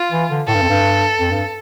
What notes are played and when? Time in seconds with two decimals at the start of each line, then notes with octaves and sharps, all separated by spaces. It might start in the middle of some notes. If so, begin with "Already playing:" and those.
Already playing: F4
0.12 E3
0.30 D3
0.47 A2 A4
0.55 G2
0.62 F2
0.69 G2
1.19 F2
1.31 G2